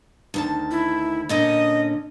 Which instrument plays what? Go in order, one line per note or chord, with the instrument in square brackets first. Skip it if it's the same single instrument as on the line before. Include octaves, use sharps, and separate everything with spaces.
[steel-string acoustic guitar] D2 D#3 A5
[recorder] E4
[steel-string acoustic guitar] A#2 D3 C#4 [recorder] D#5